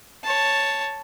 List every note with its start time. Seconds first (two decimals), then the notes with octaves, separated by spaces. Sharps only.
0.23 C#5 A5